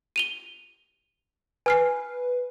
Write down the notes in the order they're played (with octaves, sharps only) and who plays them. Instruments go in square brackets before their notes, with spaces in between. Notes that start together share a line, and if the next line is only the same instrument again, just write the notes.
[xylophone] D#7 F7 G7
[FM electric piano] B4 [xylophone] G#5 F6 C7